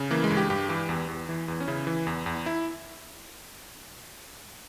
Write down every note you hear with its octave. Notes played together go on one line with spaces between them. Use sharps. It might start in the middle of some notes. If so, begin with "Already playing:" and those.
Already playing: C#3
E3 A#3
G#3
G2
G4
G2 G4
E3 G4
E2
E2
E3
E2
C#4
C#3 E4
E3
E2
E2
E4